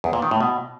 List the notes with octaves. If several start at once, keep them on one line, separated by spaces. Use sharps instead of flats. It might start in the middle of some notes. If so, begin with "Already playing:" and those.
E2
A#2
D#3
A2
B2